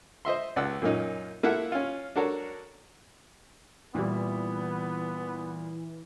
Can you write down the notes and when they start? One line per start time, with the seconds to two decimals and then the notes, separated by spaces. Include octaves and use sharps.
0.25 C5 D#5 E5 C6
0.56 C#2 D5 F#5 E6
0.82 F#2 A#2 A#3 C#4 D#4
1.43 A#3 E4 F4 A4 E5 F#5
1.72 C#4 F4
2.16 D4 F#4 A4 A#4 C#5
3.95 A#2 E3 G3 B3